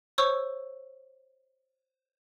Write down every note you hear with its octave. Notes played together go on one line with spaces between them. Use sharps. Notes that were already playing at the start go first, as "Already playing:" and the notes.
C5 C#5 C#6 E6